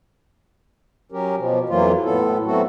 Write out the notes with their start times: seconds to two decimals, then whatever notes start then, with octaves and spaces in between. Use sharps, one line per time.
1.12 F#3 C#4 G4 A#4
1.38 B2 F3
1.69 F2 E3 F#3 A#3 F4
2.05 A2 B3 A4
2.45 F#3 A3 B3 C4 F#4 A4